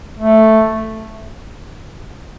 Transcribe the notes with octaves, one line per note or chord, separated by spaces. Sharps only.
A3